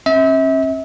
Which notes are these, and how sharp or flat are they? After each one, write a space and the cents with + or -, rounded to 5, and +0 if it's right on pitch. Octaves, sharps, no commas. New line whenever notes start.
C#4 -45 E5 -35